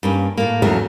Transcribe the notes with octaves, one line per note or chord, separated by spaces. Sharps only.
G2 A#3 C#4
A2 A#3
E2 C#3 F#3 A3 A#4 C#5